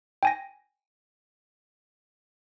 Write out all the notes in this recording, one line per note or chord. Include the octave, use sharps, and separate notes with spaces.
G5 G#5 A#6